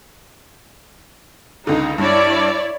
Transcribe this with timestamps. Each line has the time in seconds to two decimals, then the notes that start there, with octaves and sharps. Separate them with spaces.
1.67 C#2 D3 D#4
1.98 G2 E4 C#5 D5